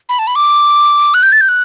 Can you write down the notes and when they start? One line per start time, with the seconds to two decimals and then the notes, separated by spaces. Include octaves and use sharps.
0.09 B5
0.19 A5
0.27 B5
0.36 D6
1.14 F#6
1.23 G6
1.32 A6
1.41 G6
1.49 F#6